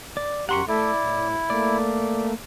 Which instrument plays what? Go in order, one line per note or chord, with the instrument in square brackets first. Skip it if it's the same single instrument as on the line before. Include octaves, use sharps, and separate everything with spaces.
[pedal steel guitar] D5
[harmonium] F#2 G4 A#5 [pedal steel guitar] F#5 C6 C#6
[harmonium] A3 A4 E5 [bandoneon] E4 [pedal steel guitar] D5
[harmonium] A2
[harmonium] A3 A#3 [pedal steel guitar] D5